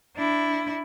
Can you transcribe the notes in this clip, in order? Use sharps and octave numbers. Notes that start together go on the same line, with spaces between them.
D4 E4